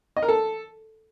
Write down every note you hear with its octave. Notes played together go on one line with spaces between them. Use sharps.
D#5
A#4
A4